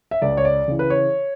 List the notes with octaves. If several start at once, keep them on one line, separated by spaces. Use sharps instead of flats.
E5
C#2 D5
C#5
D5
C#3 E3
B4
C#5